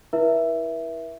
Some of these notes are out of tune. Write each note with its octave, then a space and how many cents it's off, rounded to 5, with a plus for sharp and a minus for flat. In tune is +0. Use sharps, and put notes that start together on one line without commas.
E4 -10 B4 -45 E5 +0